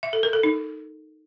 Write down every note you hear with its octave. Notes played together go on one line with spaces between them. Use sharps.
E5
A4
A#4
A4
D#4